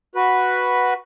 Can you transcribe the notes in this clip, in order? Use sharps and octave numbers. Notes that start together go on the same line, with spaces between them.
F#4 B4